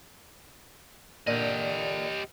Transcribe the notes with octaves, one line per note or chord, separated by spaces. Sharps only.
A#2 D3 G4 D#5